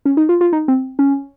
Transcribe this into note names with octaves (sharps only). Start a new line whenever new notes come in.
C#4
D#4
F4
F4
D#4
C4
C#4